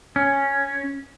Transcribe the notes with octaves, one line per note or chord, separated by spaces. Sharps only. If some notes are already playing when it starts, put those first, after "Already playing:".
C#4